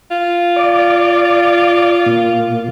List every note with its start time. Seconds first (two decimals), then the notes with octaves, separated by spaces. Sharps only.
0.11 F4
0.56 D5
2.06 A#2